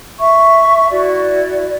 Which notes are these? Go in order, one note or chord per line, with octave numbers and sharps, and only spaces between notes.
E5 C#6
E4 F#4 D5